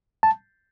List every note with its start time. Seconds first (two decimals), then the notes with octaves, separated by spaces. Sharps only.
0.23 A5